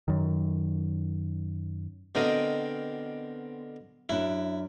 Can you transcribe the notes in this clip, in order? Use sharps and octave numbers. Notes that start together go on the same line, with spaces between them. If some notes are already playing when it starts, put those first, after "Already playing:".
F#2 D#3
B2 D3 C4 A#4 D#5
F#2 D4 E4